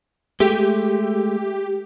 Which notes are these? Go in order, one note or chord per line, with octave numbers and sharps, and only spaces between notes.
G#3 A3 G4